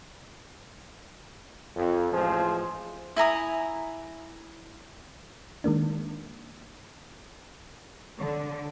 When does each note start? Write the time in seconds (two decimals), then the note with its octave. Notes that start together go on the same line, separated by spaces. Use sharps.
1.76 F2
2.12 A1 F3 G#3 G#4 C5
3.16 E4 G#5 A#5 D#6
5.64 D#3 G#3 A#3 D4
8.19 D3